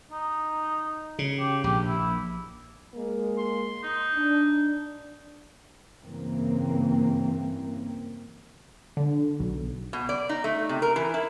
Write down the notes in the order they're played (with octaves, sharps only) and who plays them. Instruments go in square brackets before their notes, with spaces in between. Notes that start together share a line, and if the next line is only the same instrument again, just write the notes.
[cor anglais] D#4
[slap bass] C#3
[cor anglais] G4
[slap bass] A#1 [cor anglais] G4
[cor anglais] E4
[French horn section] G#3 A#3
[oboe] C6
D#4
[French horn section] D4
[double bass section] G2 C#3 E3 A#3 C4
[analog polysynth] D3
B1
[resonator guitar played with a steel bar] B2
D5
D#4
A3
C3
A#4
E3
E4